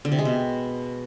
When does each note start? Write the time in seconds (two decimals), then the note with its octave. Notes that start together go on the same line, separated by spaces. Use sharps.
0.05 D3
0.12 C3
0.19 G#3
0.25 B2